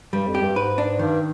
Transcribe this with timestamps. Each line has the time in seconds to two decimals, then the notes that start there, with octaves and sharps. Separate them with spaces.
0.13 G2 G3
0.27 F2
0.35 G4
0.42 G2
0.56 G#2 B4
0.78 D4
0.99 G2 D#3